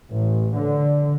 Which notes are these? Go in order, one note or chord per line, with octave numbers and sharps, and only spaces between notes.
A1
D3